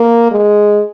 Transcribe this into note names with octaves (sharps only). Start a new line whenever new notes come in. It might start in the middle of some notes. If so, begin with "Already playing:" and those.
Already playing: A#3
G#3